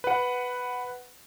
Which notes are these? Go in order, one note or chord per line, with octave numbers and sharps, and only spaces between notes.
B4 F#5